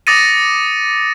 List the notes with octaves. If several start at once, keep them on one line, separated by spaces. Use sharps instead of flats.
D6 D#6 A6 A#6 C#7 D#7